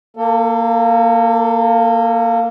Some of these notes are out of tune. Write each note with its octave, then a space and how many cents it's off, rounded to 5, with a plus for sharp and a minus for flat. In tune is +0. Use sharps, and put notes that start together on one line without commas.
A#3 -5 A4 +30